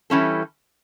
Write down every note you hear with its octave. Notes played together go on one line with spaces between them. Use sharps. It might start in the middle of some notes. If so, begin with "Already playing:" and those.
E3 G3 C#4 E4 A4